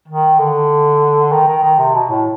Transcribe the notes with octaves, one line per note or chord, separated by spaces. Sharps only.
D#3
D3
D#3
D#3
D#3
C3
B2
A2